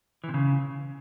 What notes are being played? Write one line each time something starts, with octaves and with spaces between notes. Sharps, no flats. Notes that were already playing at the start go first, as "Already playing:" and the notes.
E3
C3
C#3